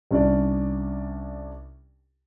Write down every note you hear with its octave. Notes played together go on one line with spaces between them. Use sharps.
C2 C#4 D4 D5